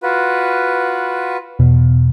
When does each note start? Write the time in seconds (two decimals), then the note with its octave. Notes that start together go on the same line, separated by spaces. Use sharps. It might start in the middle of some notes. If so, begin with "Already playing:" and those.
0.03 F4 F#4 B4
1.59 E2 B2